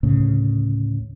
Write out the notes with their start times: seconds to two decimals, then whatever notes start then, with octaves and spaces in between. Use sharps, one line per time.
0.03 D2 A2 C#3